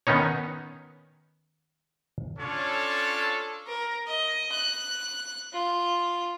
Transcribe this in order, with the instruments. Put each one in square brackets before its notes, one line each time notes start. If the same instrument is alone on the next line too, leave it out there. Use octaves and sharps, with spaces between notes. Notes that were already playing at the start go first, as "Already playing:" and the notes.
[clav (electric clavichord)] D#3 B3 C#4 D#4 C#5
[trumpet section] C#4 D4 F4 A4 C#5
[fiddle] A#4
D#5
F#6
F4